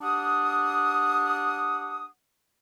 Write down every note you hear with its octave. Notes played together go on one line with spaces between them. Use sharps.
D4 G4 F#5 D#6